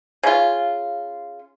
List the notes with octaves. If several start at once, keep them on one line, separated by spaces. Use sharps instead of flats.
C#3 F4